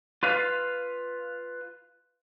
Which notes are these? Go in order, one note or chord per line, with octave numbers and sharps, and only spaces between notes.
F4 B4 F5